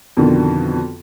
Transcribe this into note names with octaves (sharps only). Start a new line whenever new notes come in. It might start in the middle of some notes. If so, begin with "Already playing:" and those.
F2 B2 D3 D#3